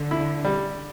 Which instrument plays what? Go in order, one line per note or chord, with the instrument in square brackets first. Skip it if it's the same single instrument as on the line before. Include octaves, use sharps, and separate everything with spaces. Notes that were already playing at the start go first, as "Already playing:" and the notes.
Already playing: [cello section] D3
[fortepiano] E4
G3